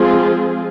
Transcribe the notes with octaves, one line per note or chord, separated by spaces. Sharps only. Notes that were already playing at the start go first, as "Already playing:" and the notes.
Already playing: F3 G#3 C4 F4 G#4